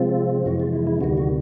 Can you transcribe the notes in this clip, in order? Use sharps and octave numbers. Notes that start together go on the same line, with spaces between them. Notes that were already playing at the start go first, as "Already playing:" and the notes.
Already playing: C3 F3 G#3 C4 F4
F2 C3 E3 G#3 F#4
F4
E4
E4
D2 C3 D#3 G3 F#4
F#4